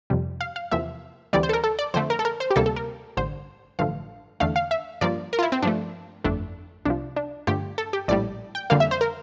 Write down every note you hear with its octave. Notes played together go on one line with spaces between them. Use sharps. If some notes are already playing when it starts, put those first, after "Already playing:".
F2 C3 G3
F5
F5
E2 C3 F3 A#3 E5
D2 C3 E3 G3 D5
C5
A4
A#4
A4
D5
F2 D3 A3 C5
A#4
A4
A#4
C5
G4
D2 C3 G3 A#3 A4
A4
A#4
A1 G2 D3 C5
A1 G2 D3 F3 A3 F5
E2 D3 A3 F5
F5
E5
G2 F3 A#3 D5
A#4
F4
E4
C4
G2 F3 A3 D4
G1 F2 D3 A3 D4
C2 C3 F3 D4
D4
G2 D3 F3 A3 G4
A4
G4
A#1 A2 G3 D5
G5
F2 D3 G3 A#3 F5
E5
C5
A#4